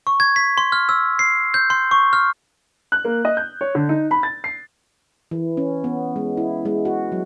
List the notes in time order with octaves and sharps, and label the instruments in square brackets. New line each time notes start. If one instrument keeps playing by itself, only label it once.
[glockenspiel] C#6
G#6
B6
C6
F6
E6
C7
G6
C6
C#6
F6
[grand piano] F#6
A#3
D#5
G6
C#5
D3
D#4
B5
A6
C7
[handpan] E3
C#4
B3
G#3
E4
G#3
F#4
F#3